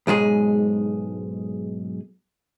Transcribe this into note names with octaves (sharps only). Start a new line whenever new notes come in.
B1 G#2 G#3 G#4